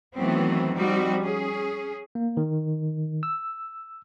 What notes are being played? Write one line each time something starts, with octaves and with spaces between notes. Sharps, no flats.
D#3 E3 F#3 A3 B3 C4
F3 G3 C4 D#4 F#4
C#4 G#4
A#3
D#3
E6